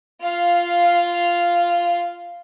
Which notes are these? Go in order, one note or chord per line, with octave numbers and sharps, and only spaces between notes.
F4 F5